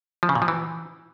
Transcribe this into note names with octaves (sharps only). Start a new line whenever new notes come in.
F3
C#3
A#2
F3
E3